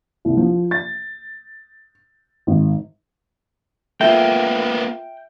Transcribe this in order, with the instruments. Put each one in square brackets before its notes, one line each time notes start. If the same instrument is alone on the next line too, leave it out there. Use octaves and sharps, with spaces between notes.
[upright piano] C2
F3
A6
G#1
[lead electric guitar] A#3 B3 [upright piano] F4 A4 [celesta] E5 [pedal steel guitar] G5